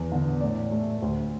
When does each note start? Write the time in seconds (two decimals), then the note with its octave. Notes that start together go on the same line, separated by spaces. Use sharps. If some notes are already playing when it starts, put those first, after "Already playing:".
Already playing: E2
0.12 D3 B3
0.41 A2 D5
0.71 A3
1.02 D2